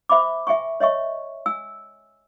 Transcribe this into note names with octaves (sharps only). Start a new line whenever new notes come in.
C5 E5 B5 D6
E5 G5 G#5 C#6
C#5 D#5 E5 C#6
G#5 E6